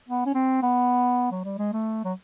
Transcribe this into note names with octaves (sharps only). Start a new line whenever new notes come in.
B3
C#4
C4
B3
F#3
G3
G#3
A3
F#3